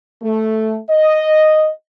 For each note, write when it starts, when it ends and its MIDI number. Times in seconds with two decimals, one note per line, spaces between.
0.23 0.77 57
0.90 1.70 75